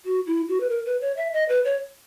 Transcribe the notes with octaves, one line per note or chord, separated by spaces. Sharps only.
F#4
E4
F#4
B4
A#4
B4
C#5
E5
D#5
B4
C#5